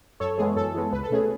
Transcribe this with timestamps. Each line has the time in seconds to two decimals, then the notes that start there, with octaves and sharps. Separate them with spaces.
0.20 F#2 A4 C#5
0.38 E3 G#3 B3 G#4
0.56 F#2 A4
0.74 E3 G#3 B3
0.92 C#2 B4
1.03 A4
1.10 B2 A3 C#4 G#4